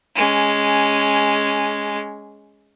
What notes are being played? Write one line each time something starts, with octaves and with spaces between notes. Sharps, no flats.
G#3 C#4